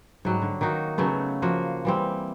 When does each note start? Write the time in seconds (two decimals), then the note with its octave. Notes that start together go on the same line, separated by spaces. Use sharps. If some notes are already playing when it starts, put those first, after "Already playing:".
0.25 G#2 F#3 G3
0.42 D3
0.61 D#3 A#3 D#4 F#4
0.98 C#3 F#3 A3 B3
1.42 F3 A#3 F#4
1.85 E3 G3 C4